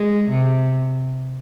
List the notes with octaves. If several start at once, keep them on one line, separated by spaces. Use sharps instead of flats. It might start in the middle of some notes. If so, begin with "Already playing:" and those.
Already playing: G#3
C3